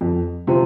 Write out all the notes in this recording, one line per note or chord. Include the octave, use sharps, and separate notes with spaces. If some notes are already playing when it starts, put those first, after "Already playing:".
F2
C3 F3 C4